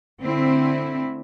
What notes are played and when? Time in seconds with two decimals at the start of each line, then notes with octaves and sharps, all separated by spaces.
0.20 D3 A3 C4 E4